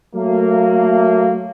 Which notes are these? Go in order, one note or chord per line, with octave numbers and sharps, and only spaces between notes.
F#3 A3 A#3